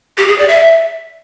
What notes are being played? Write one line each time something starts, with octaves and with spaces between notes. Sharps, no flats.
G4
G#4
D5
E5